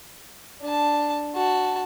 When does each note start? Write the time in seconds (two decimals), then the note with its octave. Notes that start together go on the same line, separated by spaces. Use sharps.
0.61 D4 A5
1.35 F#4 A5